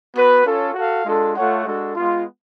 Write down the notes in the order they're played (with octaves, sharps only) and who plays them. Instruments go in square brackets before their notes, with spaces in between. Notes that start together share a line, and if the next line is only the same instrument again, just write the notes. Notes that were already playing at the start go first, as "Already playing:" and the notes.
[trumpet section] B3 F#4 B4
C#4 F4 A4 C#5
F#4 A4 F5
G#3 D4 F4 A4
A3 F4 A4 C#5 F#5
G#3 D4 F#4 A4
G#3 B3 F4